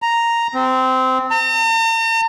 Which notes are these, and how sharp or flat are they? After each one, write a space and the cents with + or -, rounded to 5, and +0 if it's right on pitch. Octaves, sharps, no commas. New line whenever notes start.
A#5 +0
C4 -15
A#5 -45